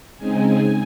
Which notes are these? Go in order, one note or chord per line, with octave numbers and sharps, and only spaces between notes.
C#3 G#3 C4 D#4 G#5